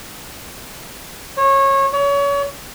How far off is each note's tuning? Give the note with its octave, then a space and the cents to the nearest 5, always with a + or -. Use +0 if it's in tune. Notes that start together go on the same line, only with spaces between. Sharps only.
C#5 -25
C#5 +30